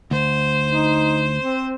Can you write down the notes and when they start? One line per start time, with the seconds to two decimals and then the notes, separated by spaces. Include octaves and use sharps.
0.11 D2 C5
0.68 D#4
1.42 C4